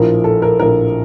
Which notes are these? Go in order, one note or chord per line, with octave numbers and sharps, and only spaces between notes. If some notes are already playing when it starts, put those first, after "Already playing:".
Already playing: A#1 A2 F3 A#4
A4
A#4
A#1 A2 F3 A#4